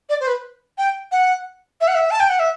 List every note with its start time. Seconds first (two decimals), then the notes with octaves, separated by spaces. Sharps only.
0.09 D5
0.21 C5
0.27 B4
0.78 G5
1.12 F#5
1.81 E5
1.88 F#5
1.95 E5
2.11 A5
2.20 G5
2.30 F#5
2.39 E5